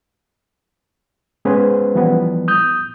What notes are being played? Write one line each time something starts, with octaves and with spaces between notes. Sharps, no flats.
G#3 B3 C#4 G#4 B4 C5
E3 F3 G3 B3
D#6 G6